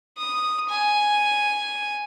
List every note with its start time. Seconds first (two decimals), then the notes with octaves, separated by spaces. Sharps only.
0.18 D#6
0.69 G#5